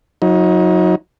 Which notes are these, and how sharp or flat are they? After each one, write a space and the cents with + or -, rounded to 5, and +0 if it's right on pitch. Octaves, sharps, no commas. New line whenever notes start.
F#3 -25 D#4 +25